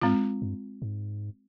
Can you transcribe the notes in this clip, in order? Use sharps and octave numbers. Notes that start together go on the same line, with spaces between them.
G#2 G#3 C4 F4
G2
G#2